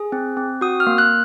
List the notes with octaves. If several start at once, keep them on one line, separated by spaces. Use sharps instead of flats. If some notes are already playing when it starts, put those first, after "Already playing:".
Already playing: G#4
C4
C4
F#4 D#6
F6
A#3
F#6